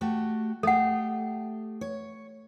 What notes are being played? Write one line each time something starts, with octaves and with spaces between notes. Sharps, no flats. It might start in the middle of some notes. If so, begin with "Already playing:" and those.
A3 F#4 G4
A3 G4 A4 F#5
C#5